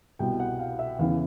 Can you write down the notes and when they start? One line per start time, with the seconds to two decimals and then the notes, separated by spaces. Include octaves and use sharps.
0.19 C2 B2 G5
0.40 F#5
0.59 F5
0.79 E5
0.99 E2 C#3 E3 F5